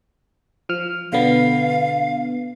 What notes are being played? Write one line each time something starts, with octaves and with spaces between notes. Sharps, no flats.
F3 F6
B2 D3 B3 F5